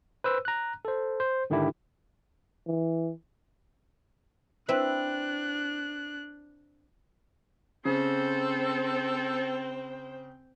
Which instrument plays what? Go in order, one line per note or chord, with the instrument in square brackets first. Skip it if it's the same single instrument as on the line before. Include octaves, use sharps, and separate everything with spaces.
[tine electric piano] B4 C5 E6
A#5 F#6
A4 C5
C5
G#2 D3 D#3 D4 E4 G4
[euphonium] E3
[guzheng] C4 E4 B4 [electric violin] D4 F#6
[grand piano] C#3 [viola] C4 G5 [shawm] A4 [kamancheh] C5